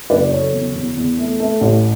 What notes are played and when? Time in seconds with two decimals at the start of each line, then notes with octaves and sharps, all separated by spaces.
0.10 F#1 B4 D5
0.31 F#1 A4 C#5
0.53 E2
0.75 E2
0.96 E2
1.18 A3
1.40 A3
1.61 A1